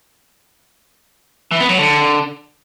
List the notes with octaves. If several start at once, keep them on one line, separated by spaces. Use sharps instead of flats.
E3
B3
F#3
D3